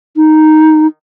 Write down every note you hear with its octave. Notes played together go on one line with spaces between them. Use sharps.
D#4